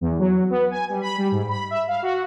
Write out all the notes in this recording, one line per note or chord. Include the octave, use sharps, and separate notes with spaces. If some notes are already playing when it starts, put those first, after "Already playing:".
E2
F#3
B3
G#5
G3
B5
G3
G#2
B5
E5
F5
F#4